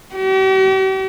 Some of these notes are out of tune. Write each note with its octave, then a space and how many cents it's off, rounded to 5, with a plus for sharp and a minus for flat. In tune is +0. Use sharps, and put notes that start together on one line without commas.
G4 -45